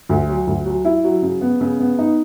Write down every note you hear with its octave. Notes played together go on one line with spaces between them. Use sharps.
D2
F#3
D2
F#3
E4
F#3
C#3
B3
C#3
B3
D#4